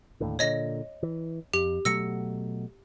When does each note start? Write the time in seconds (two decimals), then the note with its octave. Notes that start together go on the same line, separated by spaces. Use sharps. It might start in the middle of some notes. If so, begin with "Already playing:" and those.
0.20 D#2 A2 D3
0.39 A#2 D3 C#5 D#5 A#6
1.03 E3
1.54 F2 G4
1.85 B2 F#3 A3 E6 A#6 C#7